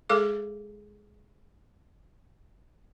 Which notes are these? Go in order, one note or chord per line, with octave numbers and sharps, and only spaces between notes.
G#3 G#4 A4 F5 D6